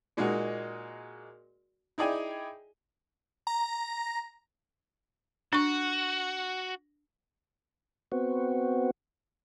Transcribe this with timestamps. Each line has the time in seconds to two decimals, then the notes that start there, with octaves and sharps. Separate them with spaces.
0.17 A#2 G#3 A#3 D#4 F#4
1.98 D#4 E4 G#4 D5 G5 G#5
3.47 A#5
5.53 D4 F#4 C#6
8.12 B3 C4 F#4